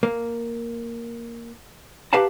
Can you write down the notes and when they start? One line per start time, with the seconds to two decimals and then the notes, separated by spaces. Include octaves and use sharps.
0.03 A#3
2.13 G4 B4 F5 F#5 A5 A#5